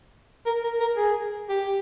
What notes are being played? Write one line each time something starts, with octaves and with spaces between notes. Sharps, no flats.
A#4
A#4
A#4
G#4
G4